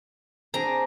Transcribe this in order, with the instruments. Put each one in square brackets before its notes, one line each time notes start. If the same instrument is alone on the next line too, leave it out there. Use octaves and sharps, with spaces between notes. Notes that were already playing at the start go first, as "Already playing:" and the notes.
[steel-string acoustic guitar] C4 D4 G#4 [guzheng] A#5